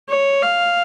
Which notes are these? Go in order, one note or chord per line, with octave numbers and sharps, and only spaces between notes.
C#5
F5